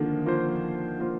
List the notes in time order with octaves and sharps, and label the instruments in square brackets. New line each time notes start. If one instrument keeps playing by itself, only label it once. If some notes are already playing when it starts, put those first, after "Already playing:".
Already playing: [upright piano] D3 D#3 [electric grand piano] F3 A#3 F4
[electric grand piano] F3 A#3 F4 C5
F3 A#3 F4 C5